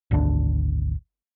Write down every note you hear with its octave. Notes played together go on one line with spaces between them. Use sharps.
G#1 D2 D4